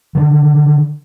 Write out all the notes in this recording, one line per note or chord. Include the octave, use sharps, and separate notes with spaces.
D3 D#3